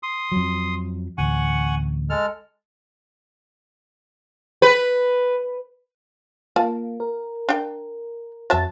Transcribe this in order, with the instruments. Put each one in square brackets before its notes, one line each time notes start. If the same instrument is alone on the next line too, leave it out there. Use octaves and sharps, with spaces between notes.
[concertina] C6 D#6
[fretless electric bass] F2 F#3
[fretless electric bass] A1 D2 [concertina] F#5 G#5 C#6
[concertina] G#3 A4 F6
[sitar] B4
[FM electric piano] A#3 [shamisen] F4 A5
[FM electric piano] A#4
[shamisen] D4 G5
[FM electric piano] F2 A6 [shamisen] F#3 E5 A5